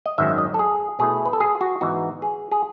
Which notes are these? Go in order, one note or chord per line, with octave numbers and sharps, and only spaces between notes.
D#5
G#1 F#2 D#3 F#3 E5
D#5
A4
G#4
B2 A3 E4 G#4
B4
A4
G#4
F#4
G#2 E3 B3 D#4 F#4
G#4
G#4